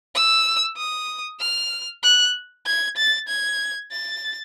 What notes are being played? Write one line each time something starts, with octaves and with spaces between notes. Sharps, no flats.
E6
D#6
F6
F#6
G#6
A6
G#6
A6